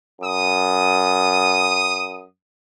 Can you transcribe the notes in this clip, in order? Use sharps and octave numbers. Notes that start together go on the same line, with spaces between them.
F#2 D#6